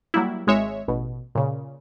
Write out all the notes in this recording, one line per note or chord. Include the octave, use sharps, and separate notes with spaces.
F#3 G3 A#3 E4
G#1 G#3 C#5 E5
A1 B2
A#2 C#3